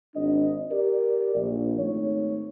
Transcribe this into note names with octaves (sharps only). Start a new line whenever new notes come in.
G#1 D4 D#5
G4 A#4 D5
A#1
G#1 A3 D#4 C#5